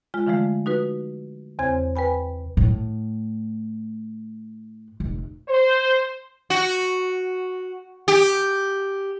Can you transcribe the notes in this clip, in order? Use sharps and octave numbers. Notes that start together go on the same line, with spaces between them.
G#3 F4 F6
D3 E3 F3 G#3 A3
D#4 F#4 B4
E2 C#3 C4 C5 G#5 G#6
B4 G5 G#5 B5
A2
F1
C5
F#4
G4